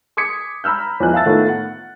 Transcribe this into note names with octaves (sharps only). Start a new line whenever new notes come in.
C6 D6 D#6 G#6 B6 C#7
A#5 B5 E6 F6 G6
E2 E3 F3 D#4 B4 F#6
E5 F5 A5 E6 A6
A2 D#3 A3 B3 F4
F#5